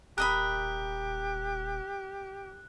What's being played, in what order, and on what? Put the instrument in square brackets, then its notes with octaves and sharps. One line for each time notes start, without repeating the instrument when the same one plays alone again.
[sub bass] D#1 [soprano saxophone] G4 [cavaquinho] A#4 D#5 B5 [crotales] F#6